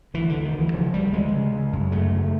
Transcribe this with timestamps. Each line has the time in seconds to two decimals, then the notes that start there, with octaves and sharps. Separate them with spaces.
0.14 D2 E3
0.29 D3
0.34 D2
0.44 D#3
0.53 D2
0.59 E3
0.74 C#3 F3
0.94 D2 G3
1.13 D2 G#3
1.33 C#3
1.52 C#3
1.73 F#2
1.92 C#3 A3
2.12 C#3